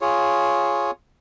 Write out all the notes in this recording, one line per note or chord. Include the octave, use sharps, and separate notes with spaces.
F4 G#4 C#5